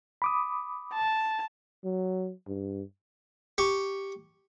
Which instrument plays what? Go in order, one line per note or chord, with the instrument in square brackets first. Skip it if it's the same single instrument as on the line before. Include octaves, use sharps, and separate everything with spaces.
[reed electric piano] B5 D6 D#6
[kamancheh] A5
[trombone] F#3
G2
[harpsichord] G4 C#6